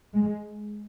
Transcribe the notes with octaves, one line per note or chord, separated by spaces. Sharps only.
G#3